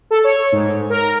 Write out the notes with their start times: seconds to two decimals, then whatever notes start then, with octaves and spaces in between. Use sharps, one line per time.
0.11 A4
0.24 C#5
0.52 G#2
0.90 A#4